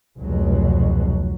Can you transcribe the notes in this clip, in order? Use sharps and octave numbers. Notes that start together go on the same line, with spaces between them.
F1 C#2 B2 F#3